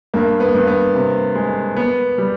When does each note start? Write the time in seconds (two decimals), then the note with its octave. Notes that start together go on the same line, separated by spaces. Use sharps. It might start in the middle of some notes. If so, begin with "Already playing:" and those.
0.14 G2 A#3
0.40 B3
0.54 G2
0.67 B3
0.95 C3
1.35 G#3
1.77 B3
2.18 G3